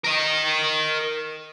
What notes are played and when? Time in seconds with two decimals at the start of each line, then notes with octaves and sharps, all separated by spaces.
0.04 A#4 D#5